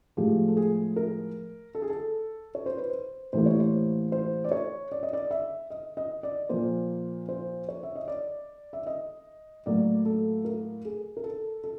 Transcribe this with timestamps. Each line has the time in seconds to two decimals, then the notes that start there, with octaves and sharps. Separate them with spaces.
0.17 A2 F3 G#3 G4
0.48 A4
0.57 G#4
0.96 A#4
1.75 A4
1.82 G#4
1.90 A4
2.55 C#5
2.66 C5
2.77 B4
2.90 C5
3.33 A2 E3 G3 A#3 C5
3.46 C#5
3.60 C5
4.12 C5
4.44 D5
4.51 C#5
4.92 D5
5.03 D#5
5.13 D5
5.31 E5
5.70 D#5
5.97 D#5
6.23 D5
6.49 A#2 F3 A#3 C5
7.29 C5
7.69 C#5
7.83 E5
7.95 D#5
8.08 D5
8.73 E5
8.87 D#5
9.66 A2 F#3 A#3 D5
10.05 A4
10.45 A#4
10.85 G#4
11.17 A#4
11.24 A4
11.64 A4